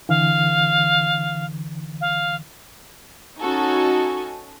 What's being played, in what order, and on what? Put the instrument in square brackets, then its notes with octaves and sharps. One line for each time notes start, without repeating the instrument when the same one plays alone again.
[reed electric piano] D3 E3 [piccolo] F5
[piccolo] F5
[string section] C#4 D#4 F#4 A4 G#5 C#6